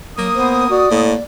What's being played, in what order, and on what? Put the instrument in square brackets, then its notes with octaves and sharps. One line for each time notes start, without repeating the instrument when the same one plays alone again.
[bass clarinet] F#3 [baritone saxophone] A#3 [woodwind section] D#6
[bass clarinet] B3 [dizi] C5
[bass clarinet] F#4 [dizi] D5
[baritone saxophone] A2 [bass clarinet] A#3